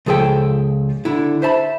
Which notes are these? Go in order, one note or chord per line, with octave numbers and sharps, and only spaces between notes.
C#2 F3 G#4 A4 G5
D3 E4
C5 E5 A5 B5